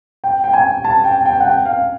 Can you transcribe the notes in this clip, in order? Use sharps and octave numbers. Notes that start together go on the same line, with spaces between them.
G5
G5
G#5
A5
G5
G5
F#5
G5
F5